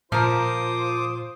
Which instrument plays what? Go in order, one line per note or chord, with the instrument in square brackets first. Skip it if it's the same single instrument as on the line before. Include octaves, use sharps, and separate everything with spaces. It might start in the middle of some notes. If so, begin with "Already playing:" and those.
[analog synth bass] A#2 [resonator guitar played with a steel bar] F3 A#4 [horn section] F4 C5 [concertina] D6 D#6